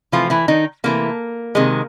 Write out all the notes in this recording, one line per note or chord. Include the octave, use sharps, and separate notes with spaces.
C3 E3 F3 A3 F4
E3 E4
D#3 D#4
C3 E3 A3 A#3
C3 D#3 G#3